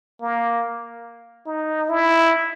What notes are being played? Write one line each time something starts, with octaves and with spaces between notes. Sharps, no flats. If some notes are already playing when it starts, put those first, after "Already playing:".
A#3
D#4
E4